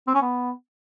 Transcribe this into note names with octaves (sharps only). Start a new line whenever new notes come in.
C4
C#4
B3